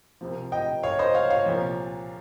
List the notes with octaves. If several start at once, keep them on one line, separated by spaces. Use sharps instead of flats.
C2 C3 F3
D#5 G5
C#5 F5
C5 D#5
C#5 F5
C#5 F5
C2 A#2 F3